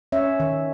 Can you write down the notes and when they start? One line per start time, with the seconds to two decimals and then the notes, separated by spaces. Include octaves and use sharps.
0.12 C#4 C#5 E5
0.40 D#3